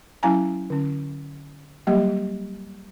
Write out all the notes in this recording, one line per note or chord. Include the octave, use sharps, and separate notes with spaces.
F#3 C#4 E4 F5 G#5 A#5
D3 C#4
F#3 G3 A#3 G4 D#5